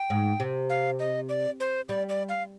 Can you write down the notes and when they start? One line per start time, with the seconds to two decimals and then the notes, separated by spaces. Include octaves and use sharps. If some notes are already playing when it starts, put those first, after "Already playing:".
Already playing: G5
0.10 G#2
0.40 C3
0.70 F5
0.99 D#5
1.29 D5
1.60 C5
1.89 G3 D5
2.09 D5
2.29 F5